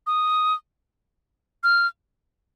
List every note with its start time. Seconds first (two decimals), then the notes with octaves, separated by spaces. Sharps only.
0.07 D#6
1.63 F6